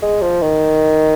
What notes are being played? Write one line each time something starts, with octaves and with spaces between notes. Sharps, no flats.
G#3
F3
D#3